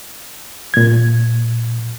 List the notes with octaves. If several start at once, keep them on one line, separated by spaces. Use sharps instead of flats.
A#2 G#6